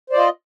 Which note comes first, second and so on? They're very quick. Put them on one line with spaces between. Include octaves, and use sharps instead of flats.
C5 D5 F4 D#5